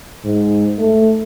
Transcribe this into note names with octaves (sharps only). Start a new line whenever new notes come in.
G#2
A3